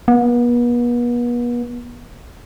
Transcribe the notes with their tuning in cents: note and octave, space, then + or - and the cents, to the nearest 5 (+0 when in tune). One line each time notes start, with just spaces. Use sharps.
B3 -40